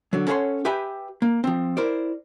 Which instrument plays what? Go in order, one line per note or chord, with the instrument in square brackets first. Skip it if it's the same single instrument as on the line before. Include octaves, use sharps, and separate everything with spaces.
[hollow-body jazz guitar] D3 F#3
C#4 A4 C#5 F#5 G#5 C6
G4 B4 E5 G5 G#5 B5
A#3
F3 C4
E4 A#4 C5 D5